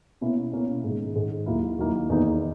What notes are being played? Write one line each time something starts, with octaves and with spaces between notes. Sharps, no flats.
B2 A#3 C#4 E4
B2 A#3 C#4 E4
G#2 D#3 G#3
G#2 D#3 G#3
D#2 D#3 F#3 A#3 E4
D#2 D#3 F#3 A#3 E4
E2 D#3 A#3 D#4